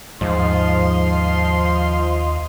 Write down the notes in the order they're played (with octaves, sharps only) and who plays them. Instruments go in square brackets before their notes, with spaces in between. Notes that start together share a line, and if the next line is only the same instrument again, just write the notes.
[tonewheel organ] D#2 D#5 F5 [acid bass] G#2 [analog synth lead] F3 [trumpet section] C6